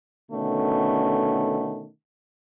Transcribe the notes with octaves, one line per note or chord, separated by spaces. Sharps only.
B2 D3 D#3 A3 C#4